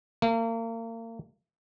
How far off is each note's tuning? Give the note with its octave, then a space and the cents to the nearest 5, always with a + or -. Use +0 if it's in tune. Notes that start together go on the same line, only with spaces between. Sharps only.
A#3 -35